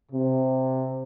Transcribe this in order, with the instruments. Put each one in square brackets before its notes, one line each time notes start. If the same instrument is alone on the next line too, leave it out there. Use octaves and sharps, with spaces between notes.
[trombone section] C3